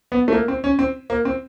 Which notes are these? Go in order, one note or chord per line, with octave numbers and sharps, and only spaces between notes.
B3
A3
A#3
C4
C#4
C4
A#3
C4